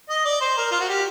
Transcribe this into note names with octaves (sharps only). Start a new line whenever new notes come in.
D#5
D5
C5
A#4
F4
F#4
G4